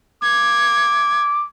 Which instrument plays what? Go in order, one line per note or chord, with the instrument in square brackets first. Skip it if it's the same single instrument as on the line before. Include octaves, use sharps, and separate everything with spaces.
[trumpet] D6 [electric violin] G#6